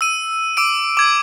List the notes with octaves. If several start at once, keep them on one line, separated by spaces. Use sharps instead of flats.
E6 D#7
D6 E6 D7
D6 G#6